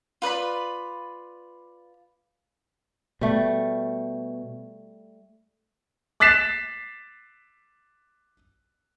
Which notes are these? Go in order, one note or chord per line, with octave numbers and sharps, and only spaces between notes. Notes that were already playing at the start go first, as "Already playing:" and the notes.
F4 B4 D5 B5
B2 G3 A3
D6 F#6 A6 B6 C7 E7